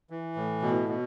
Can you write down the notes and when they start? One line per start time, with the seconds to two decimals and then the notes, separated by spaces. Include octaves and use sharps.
0.10 E3
0.36 A2
0.62 B2
0.89 B2